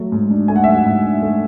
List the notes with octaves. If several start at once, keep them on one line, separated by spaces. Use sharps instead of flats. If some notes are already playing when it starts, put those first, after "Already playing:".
Already playing: F#3 A3
G#2
D4
A3 G#5
F#5
E5
F#3 F#5
G#2
D4
A3